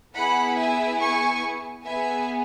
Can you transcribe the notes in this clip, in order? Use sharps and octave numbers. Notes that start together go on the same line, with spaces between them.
B3 E4 G#4 F#5 B5
E5 G#5
G#5 C#6
B3 G#4 E5 G#5